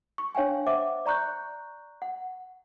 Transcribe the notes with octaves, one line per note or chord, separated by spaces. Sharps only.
C#6
D4 C#5 F5 G5 G#5
C5 E5 F#5 D6
D5 A#5 C#6 F#6 G6
F#5